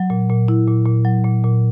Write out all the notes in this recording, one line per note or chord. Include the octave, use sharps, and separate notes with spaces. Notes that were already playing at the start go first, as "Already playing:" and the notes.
Already playing: F#3
A#2
A#2
E4
A#2
A#2
F#3
A#2
A#2